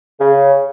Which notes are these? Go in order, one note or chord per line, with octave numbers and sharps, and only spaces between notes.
C#3